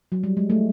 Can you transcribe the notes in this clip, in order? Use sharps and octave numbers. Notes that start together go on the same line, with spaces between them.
F#3
G3
G#3
A3